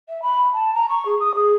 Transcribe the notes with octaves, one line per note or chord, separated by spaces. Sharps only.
E5
B5
A5
A#5
C#6
G#4
D#6
G#4